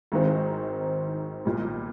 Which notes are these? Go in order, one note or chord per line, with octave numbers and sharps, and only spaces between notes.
G#1 G#2 D#3 G#3 C4
B1 A#2 G3